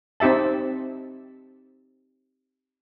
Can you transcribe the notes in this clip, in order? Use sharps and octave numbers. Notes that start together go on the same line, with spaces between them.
C4 D#4 G4 E5 A5